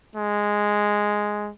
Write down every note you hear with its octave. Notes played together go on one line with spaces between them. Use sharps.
G#3